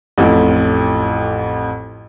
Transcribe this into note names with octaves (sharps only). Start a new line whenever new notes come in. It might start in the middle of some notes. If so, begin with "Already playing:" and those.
A1 F2 A2